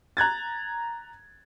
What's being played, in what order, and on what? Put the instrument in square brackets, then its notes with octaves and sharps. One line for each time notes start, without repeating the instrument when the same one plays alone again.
[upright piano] A#5 F#6 G#6 A6